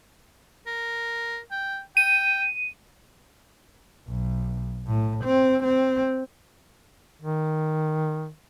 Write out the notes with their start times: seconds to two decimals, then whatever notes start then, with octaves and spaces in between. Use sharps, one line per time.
0.67 A#4
1.51 G5
1.97 G5 D#7
4.08 B1
4.86 A2
5.24 C4
5.64 C4
7.22 D#3